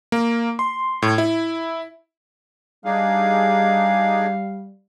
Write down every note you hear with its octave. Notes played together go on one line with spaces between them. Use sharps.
A#3
C6
A2
E4
G3 D4 D#4 G#4 F5